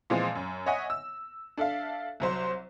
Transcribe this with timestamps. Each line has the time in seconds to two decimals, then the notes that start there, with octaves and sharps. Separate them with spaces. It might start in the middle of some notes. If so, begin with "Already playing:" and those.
0.10 A#2 E3 F3 G#3 C4
0.35 F#2
0.66 C#5 D#5 E5 F#5 G#5
0.90 E6
1.58 D4 A4 E5 F5
2.20 C2 F#3 C5